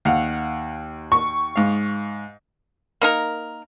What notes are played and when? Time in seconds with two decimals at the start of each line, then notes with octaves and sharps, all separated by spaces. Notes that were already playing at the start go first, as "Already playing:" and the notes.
0.05 D#2 F5 F#5
1.12 C#6
1.56 G#2 F5
3.01 A#3 D#4 A#4